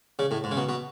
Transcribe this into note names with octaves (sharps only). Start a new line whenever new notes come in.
C#3
A2
G#2
C#3
B2
B2